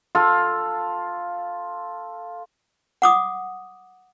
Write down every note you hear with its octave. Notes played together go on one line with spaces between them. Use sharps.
F4 A4
F#5 D6 D#6